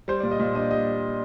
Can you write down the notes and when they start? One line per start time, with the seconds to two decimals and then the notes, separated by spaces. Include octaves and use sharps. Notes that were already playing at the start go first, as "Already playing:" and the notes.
0.08 G3 C5
0.20 A#2 D5
0.31 D#5
0.39 A#2
0.55 D4 D#5
0.71 G3 D#5